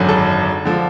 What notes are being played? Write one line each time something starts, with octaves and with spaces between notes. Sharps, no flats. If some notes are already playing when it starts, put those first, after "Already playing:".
Already playing: G#1 F#2 D3 F#3
A4
D3 F3